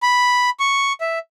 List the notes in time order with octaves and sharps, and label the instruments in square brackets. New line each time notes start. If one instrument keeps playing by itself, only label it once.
[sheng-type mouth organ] B5
C#6
E5